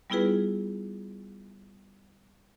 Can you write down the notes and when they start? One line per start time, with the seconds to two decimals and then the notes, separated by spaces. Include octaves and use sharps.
0.10 G3 B3 E4 F4 G#4 B4